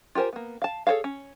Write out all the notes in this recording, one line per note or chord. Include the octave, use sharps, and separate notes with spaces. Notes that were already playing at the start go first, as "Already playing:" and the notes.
F4 G4 A#4 C5 G#5
A#3 B3
F5 A5
G#4 A4 C5 C#5 F5
C#4